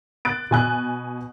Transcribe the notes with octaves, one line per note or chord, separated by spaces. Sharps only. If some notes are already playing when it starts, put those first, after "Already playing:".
F#6 A6 D7
B2 G#5 F#6